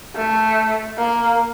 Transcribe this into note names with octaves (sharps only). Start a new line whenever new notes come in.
A3
A#3